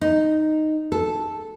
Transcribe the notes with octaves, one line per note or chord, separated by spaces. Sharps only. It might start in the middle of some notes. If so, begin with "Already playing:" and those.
D#4
A4